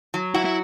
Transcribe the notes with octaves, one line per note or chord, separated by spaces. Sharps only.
F#3
E4 F#4
E4